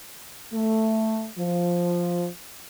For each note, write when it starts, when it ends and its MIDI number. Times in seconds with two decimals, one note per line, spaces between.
0.53 1.26 57
1.38 2.27 53